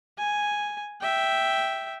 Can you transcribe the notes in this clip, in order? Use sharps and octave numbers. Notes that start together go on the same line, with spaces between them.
G#5
E5 G5